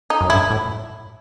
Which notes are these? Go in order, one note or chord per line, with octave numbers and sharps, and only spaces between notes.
D#4
F#2
G2 E4
A2